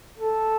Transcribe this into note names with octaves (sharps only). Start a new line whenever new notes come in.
A4